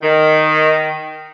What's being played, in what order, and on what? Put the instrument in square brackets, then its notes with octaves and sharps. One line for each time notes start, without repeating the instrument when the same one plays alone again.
[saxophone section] D#3